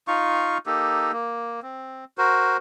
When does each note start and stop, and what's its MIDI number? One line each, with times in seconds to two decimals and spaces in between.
0.08 0.58 63
0.08 0.58 65
0.08 0.58 77
0.08 0.58 85
0.66 1.12 58
0.66 1.12 63
0.66 1.12 67
0.66 1.12 69
1.13 1.60 58
1.63 2.05 60
2.18 2.57 66
2.18 2.57 70
2.18 2.57 72